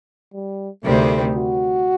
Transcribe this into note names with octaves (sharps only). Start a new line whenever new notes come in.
G3
D2 C3 D#3 G3 A3 C4
F#4